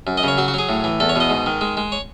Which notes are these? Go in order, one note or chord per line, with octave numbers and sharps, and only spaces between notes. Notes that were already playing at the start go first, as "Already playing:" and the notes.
F#2
D#5
C#3 C#5
F#3 F#4
F#4
F#3 G#4
A2
E3
E2 A4
C#5
B2 D#5
G#2
D#3
G#3
G#3
C#5